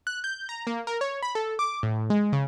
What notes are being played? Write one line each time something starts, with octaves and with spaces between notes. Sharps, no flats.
F#6
G6
A#5
A#3
A#4
C#5
B5
A4
D6
A2
G#3
C#3